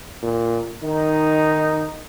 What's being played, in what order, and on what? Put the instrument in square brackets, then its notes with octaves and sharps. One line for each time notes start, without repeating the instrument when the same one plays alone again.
[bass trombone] A#2
[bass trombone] D#3 [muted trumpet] D#4